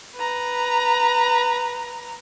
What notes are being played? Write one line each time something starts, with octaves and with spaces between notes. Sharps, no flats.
B4 A#5